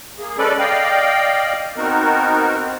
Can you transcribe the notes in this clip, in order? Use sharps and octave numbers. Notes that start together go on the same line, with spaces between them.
A#3 G#4
G#3 C#4 A4 B4 D5
D5 D#5 F5 G5
B3 C4 D#4 F#4 A#4
C4